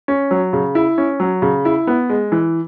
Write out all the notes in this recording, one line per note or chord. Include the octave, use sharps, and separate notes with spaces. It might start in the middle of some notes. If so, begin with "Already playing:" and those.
C#4
F#3
C#3
E4
C#4
F#3
C#3
E4
B3
G#3
E3